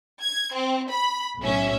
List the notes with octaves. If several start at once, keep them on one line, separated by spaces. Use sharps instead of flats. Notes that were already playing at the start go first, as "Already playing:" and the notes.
G#6
C4
B5
B1 A2 C#4 E5